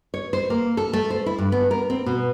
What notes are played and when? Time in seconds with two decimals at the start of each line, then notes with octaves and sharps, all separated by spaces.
0.14 C#5
0.33 C5
0.50 A#3
0.77 A4
0.93 A3
1.10 C5
1.26 E4
1.38 G2
1.52 B3
1.71 A#4
1.90 C4
2.06 B2